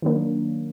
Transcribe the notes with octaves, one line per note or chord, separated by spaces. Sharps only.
D#3 F#3 A#3 D4